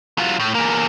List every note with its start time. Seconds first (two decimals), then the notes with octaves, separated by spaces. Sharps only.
0.18 F#3 F4
0.39 A2
0.55 E2 A#3